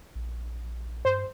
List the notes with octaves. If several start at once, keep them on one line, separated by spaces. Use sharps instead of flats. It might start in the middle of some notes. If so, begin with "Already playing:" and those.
A#1
G2 C5